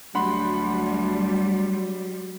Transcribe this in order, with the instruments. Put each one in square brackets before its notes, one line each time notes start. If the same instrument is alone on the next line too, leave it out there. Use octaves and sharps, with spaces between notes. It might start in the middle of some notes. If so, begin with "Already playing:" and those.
[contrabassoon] D2 [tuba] F#3 [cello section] G3 [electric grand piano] F#5 B5 C6